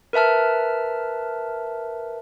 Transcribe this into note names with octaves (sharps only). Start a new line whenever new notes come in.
A#4 B4 E5 A5 F6